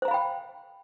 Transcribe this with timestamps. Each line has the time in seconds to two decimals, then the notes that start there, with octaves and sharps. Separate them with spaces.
0.02 C5
0.05 A#5
0.08 F5
0.11 B5
0.14 G5